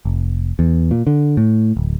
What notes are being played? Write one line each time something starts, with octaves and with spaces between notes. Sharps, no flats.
F1
E2
A#2
D3
A2
D1